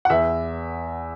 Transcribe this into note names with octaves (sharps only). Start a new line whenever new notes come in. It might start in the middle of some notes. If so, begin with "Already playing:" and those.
F#5
E2 E5